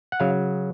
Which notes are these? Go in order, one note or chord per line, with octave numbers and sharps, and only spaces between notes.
F#5
C#3 F#3 F5